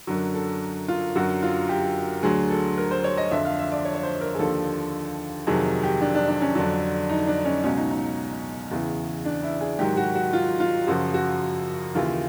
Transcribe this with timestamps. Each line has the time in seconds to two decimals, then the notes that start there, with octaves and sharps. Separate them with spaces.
0.07 F#2 D3 F#3
0.34 A4
0.88 F4
1.15 F#2 D3 F#3 F#4
1.42 F4
1.69 G4
2.23 D2 D3 F#3 G#4
2.50 A4
2.78 A#4
2.91 C5
3.04 C#5
3.17 D#5
3.31 F2 D3 F3 E5
3.45 F5
3.59 E5
3.72 D5
3.85 C#5
3.95 C#5
4.03 C5
4.21 A#4
4.35 G#4
4.39 D#2 D3 F3 A4
5.47 F2 C3 D#3 F#3 G#4
5.83 G4
6.01 D4
6.15 D4
6.28 D4
6.42 C#4
6.55 F2 D3 F#3 D4
7.09 D#4
7.27 D4
7.45 C#4
7.63 C#2 B2 F#3 C#4
7.77 D#4
7.91 D#4
8.71 E2 C#3 E3
9.25 D4
9.43 E4
9.61 G#4
9.79 G#2 D#3 F#3 G4
9.97 F#4
10.15 F#4
10.33 F4
10.60 F4
10.87 F#2 C#3 F3 F#4
11.14 F#4
11.95 D#2 C#3 E3 F4